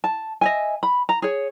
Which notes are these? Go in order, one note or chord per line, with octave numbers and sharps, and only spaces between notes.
A5
D#5 E5 G#5
B5
A#5
G#4 C#5